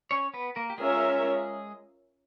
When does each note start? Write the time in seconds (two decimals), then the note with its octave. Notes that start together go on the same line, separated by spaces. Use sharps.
0.11 C#4 C#5
0.34 B3 B4
0.56 A#3 A#4
0.70 G4
0.78 G#3 C#4 F4 G#4 A#4 C#5 E5